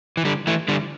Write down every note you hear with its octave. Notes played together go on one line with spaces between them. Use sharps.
E3
D3 G3
E3 A3
D3 G3